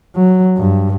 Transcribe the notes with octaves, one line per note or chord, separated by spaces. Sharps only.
F#3
G2